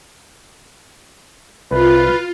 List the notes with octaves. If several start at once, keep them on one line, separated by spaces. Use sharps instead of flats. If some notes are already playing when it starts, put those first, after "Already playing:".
C2 F4 B4